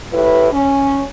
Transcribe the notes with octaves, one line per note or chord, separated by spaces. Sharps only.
A2 E4 G4 B4
C#4